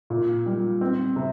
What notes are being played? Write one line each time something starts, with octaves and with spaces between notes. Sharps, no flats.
A#2
G3
C4
C3